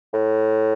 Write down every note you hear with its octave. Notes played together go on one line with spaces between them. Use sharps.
A2